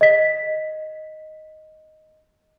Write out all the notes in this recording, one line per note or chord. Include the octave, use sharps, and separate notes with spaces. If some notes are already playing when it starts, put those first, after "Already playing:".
D#5 B6